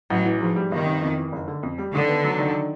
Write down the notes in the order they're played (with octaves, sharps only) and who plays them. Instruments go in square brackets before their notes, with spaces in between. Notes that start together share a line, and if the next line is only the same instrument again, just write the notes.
[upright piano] A1 [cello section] F#3
[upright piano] E3
[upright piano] G#2 [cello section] F3
[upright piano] G3
[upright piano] G1 [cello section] D#3
[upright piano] C3
F2
E3
F#1
D3
F2
G3
[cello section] D3 [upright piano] D#3
[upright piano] B3
F#3
D#3